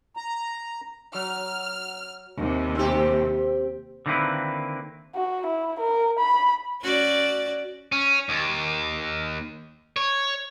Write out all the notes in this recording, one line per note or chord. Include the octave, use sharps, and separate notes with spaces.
A#5
F#3 F6
D#2 C3
C4 G4
D3 D#3 A#3 C4 E4 B4
F#4
E4
A#4
B5
C#4 F#4 D5
C#4
D#2
C#5